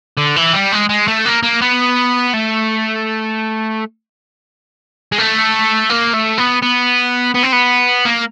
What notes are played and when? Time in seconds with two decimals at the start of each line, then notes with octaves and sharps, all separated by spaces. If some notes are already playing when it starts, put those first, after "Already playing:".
0.17 D3
0.36 E3
0.53 G3
0.72 G#3
0.89 G#3
1.08 A3
1.25 A#3
1.43 A#3
1.61 B3
2.33 A3
5.12 G#3
5.18 A3
5.90 A#3
6.14 A3
6.38 B3
6.62 B3
7.34 B3
7.43 C4
7.52 B3
8.05 A#3